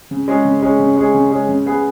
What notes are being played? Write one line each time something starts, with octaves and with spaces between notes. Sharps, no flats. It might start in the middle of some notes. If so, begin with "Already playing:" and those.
C#3
G#3 C#4 G#4
C#3
G#3 C#4 G#4
C#3
G#3 C#4 G#4
C#3
G#3 C#4 G#4
C#3
B3 G#4 B4